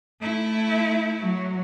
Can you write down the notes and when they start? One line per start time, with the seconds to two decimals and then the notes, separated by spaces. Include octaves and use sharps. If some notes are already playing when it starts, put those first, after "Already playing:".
0.20 A3 E4
1.21 F#3